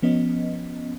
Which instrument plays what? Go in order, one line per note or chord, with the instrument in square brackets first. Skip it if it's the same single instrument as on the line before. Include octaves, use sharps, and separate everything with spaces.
[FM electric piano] F3 B3 C#4 D#5